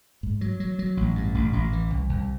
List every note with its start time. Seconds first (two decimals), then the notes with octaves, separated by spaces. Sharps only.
0.23 G#2
0.41 F#3
0.60 F#3
0.79 F#3
0.97 A1
1.15 G2
1.35 A1
1.53 A1
1.73 E3
1.90 C2
2.09 C2